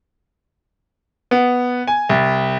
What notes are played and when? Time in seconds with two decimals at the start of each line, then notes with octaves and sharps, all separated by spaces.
1.31 B3
1.87 G#5
2.09 C2